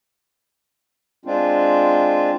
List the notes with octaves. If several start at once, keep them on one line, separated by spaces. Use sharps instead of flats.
G#3 C4 D4 F4